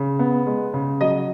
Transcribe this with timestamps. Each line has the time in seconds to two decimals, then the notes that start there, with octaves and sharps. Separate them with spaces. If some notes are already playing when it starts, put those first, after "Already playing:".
Already playing: C#3
0.19 B3
0.47 G#3
0.74 C#3
1.01 F#3 D#5